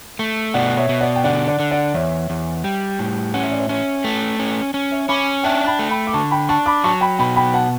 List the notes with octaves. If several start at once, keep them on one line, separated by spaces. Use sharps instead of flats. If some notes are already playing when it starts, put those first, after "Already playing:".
A3
B2 D5 F#5
C#5 E5
B2
D5 F#5
G5
D3 D5 F#5
D5 F#5
D3
D5 F#5
E2 C#5 E5
E2
G3
A2
C#4 F#5
E5
D5
C#5 E5
C#4
A3
C#4
C#4
C#5 E5
C#4 B5 D6
D4 E5 G5
G5 B5
A3
G5 B5
D6
D3 A5 C#6
G5 B5
D4 A5 C#6
B5 D6
F#3 A5 C#6
G5 B5
B2 G5 B5
G5 B5
F#5 A5